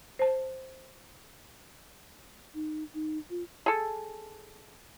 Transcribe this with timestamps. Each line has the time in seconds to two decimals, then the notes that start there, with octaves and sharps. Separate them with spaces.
0.19 C5 A5
2.55 D#4
2.94 D#4
3.30 F4
3.66 G#4 A4